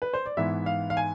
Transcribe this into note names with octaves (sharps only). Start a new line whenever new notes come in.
B4
C5
D5
G#2 E3 B3 E4 E5
F5
F5
G#5